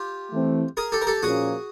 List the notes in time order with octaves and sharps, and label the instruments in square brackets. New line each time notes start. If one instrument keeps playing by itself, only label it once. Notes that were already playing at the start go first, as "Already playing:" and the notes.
Already playing: [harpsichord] F4 G4
[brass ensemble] E3 A3 C4
[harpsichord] G#4 A#4
G4 A4
A#4
G4 A4
[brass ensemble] A#2 F3 A#3 C#4 [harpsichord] F#4 G#4